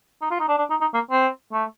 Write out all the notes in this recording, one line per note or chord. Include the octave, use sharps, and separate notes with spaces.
D#4
F4
D#4
D4
D4
D#4
D#4
A#3
C4
A3